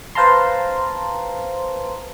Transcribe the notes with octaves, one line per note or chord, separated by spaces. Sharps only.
B4 C5 F5 A5 A#5 C6